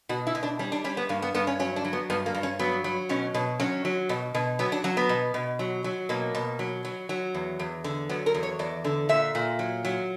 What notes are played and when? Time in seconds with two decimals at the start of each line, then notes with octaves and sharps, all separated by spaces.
0.09 B2 F#4
0.27 E4
0.35 B2
0.43 D4
0.59 G3 C#4
0.72 D4
0.84 G3 C#4
0.97 B3
1.09 G2 A#3
1.22 B3
1.34 G2 B3
1.47 C#4
1.59 F#3 C#4
1.76 D4
1.85 F#3
1.93 B3
2.10 G2 B3
2.26 A#3
2.35 G2
2.43 C#4
2.59 F#3 B3
2.84 F#3
3.09 B2 C#4
3.34 B2
3.60 F#3 C#4
3.85 F#3
4.09 B2
4.34 B2
4.59 F#3 B3
4.72 D4
4.84 F#3 C#4
4.97 B3
5.09 B2
5.34 B2
5.59 F#3
5.84 F#3
6.09 B2 A#3
6.35 B2
6.59 F#3
6.85 F#3
7.09 F#3
7.34 E2
7.59 E2
7.84 D3
8.09 F#3 B3
8.26 A#4
8.34 E2
8.43 C#5
8.59 E2 D5
8.84 D3
9.09 A#2 E5
9.35 A#2
9.59 F#3
9.85 F#3